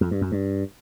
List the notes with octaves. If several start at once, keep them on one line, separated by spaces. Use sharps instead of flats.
F2
G2
F#2
G2